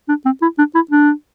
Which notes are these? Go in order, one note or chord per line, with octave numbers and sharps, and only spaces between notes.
D4
C4
E4
D4
E4
D4